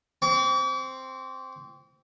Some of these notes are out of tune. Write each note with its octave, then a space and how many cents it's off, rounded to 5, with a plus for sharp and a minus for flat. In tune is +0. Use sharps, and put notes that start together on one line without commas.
C4 +0 D6 -45